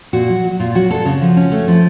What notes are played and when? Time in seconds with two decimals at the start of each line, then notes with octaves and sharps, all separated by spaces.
0.13 A#2 F#4
0.29 F#3
0.44 F#3
0.60 A#2 F4
0.75 F#3 F#4
0.91 A#2 A4
1.05 C#3 F#4
1.21 F3
1.37 C#4
1.52 A3
1.68 F3